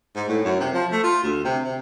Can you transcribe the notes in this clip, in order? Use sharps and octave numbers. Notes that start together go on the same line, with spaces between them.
G#2
A2
F#2
C3
F3
A3
F4
D2
C3
C3